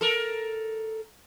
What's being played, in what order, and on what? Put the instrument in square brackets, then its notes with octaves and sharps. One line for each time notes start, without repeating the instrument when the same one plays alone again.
[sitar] A4 A#4